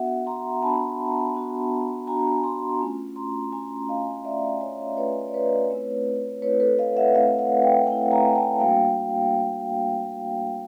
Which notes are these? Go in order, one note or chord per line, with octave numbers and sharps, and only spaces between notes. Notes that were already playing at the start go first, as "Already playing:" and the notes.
Already playing: B3 D4 F#4 E5 F#5
A#5 C6
B3 D4 F#4 A5 B5
B3 D4 F#4
B3 D4 F#4 G#5 A#5
A#5 C6
A3 C#4 F4
A#5 C6
A3 C#4 F4 G#5 A#5
D#5 F5
A3 C#4 F4 D5 E5
C#5 D#5
A3 C#4 F4 B4 C#5
D5
B4 C#5
A3 C4 E4
A3 C4 E4 B4 C#5
A4 B4
D#5 F5
E5 F#5
A3 C4 E4 D#5 F5
E5 F#5
F5 G5
A3 C4 E4 F#5 G#5
G#5 A#5
G5 A5
G3 A#3 D4 F#4 F5 G5